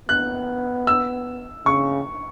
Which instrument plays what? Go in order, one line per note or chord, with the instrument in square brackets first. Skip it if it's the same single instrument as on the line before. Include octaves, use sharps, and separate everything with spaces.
[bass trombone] B3 [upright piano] F#6
[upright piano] E6
[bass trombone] C#3 [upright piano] C#6